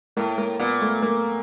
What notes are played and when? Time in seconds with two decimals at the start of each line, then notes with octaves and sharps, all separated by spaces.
0.17 A2 A#3
0.38 A#3
0.59 A#2 B3
0.81 A3
1.03 A#3